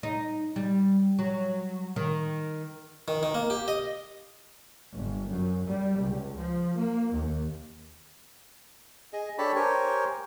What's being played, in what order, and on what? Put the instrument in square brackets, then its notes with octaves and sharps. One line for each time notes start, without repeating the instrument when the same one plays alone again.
[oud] D#4
G3
F#3
D#3
[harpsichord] D#3
D#3
A#3
G4
D#5
[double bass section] G1
F#2
G3
C#2
F3
A#3
D#2
[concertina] G#4 D#5
D4 G4 A4 C#5 A5 B5
G4 A#4 C5 C#5 G#5